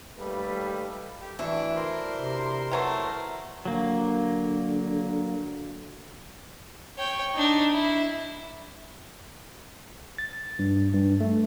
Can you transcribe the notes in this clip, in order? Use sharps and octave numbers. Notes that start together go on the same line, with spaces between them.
D#2 G3 A3 A4 B4
G4
D2 E3 D4 E4 C#6
A#4 C5 C6
C3
E3 F#3 A3
D3 F#3 A#3
C#5 G5
D4 D#4
E4
A6
G2
G2
A3